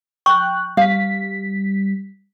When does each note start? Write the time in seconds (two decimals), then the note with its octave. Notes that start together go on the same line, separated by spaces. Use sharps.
0.26 G5 C#6 F#6
0.77 G3 F5 B6